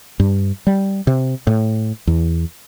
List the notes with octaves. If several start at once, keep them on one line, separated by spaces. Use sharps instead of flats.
G2
G3
C3
A2
E2